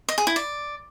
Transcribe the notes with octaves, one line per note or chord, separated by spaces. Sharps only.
D#5
G#4
E4
D5